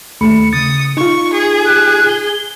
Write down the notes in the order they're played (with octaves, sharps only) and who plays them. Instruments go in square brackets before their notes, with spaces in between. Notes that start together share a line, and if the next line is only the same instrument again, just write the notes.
[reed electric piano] D#2 A3 B5 [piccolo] C#7
[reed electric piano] C#3 A6 [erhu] D#6
[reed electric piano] D#4 F4 [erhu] C#6
[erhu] G#4
[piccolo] F#6
G7